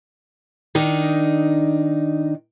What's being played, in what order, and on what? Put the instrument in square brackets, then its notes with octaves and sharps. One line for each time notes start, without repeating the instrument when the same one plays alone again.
[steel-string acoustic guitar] D#3 D4 D#4